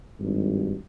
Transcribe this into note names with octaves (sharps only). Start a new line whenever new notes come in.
G#1 G2